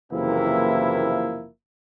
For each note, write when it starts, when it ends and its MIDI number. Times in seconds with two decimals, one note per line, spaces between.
0.12 1.47 30
0.12 1.47 48
0.12 1.47 52
0.12 1.47 53
0.12 1.47 58
0.12 1.47 64